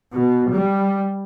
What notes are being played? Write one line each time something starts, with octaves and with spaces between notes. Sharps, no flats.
B2
G3